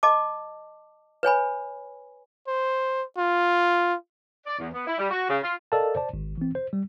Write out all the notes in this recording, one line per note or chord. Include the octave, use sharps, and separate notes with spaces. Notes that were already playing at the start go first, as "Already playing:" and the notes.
D#5 A5 D6
B4 C#5 G#5 B5
C5
F4
D5
E2
B3
E4
G3
F#4
C#3
F4
A4 A#4 D5 D#5 F5 A5
C5 D5 A5
G#1
E3 C4
C5
G3